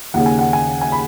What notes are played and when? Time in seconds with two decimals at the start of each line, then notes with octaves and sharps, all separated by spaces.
0.14 D#2 C#3 F#5
0.26 G#5
0.39 F#5
0.53 G#5
0.81 G#5
0.92 B5